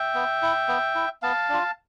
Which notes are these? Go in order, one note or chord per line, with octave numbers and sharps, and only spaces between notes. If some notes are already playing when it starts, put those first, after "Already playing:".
Already playing: E5 G5
B3
E4
B3
E4
B3 F5 A5
D4 F4